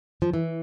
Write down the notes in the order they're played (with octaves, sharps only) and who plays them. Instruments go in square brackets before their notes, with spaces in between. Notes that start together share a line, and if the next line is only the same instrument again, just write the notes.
[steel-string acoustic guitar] F3
E3